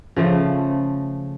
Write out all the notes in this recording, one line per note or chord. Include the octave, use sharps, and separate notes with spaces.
C#3 F3 A3